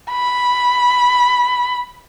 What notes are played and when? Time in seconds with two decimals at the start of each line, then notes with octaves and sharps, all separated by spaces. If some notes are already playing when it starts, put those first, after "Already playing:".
0.11 B5